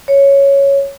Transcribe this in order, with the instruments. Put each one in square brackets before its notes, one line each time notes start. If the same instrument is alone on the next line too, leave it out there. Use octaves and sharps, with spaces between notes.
[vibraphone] C#5